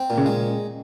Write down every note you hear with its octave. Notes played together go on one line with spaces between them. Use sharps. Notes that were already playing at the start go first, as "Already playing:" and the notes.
Already playing: C4
A#2
C#3
G#3